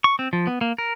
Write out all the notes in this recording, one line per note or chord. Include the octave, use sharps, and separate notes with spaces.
C#6
C4
F3
B3
A#3
A#4